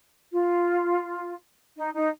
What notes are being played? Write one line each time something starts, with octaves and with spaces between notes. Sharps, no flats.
F4
D#4
D#4